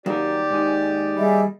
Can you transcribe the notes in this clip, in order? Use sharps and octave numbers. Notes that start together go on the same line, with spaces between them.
D#2 F#3 G4 A#4 D5
G#2 D#4
G3 G#4 D#5 E5